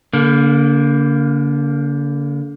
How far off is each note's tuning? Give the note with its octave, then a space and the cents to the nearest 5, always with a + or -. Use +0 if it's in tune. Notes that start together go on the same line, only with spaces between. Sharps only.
D3 -40 A#3 +0